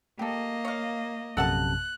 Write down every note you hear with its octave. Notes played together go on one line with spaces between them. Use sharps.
A#3 G4 A4 D#5
C#5 F5
A#1 F#2 C3 A4 F#5 A5 F#6